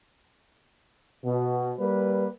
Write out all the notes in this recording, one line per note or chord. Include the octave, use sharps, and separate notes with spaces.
B2
G3 A#3 B4